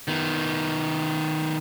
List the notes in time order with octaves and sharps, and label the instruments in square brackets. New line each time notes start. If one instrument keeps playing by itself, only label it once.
[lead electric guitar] D#3 B3